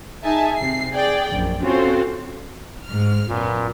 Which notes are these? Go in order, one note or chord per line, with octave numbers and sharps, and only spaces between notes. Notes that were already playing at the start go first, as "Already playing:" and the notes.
D#4 G#4 E5 G#5 A5
C3 C7
G#4 D5 G5
A#1 F#2
C4 C#4 F4 F#4 A4 C5
G#2 F6
F#2 A#2 B3